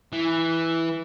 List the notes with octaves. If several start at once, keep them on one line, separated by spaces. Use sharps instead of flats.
E3